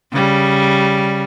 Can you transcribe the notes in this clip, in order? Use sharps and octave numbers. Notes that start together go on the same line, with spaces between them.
C#3 G3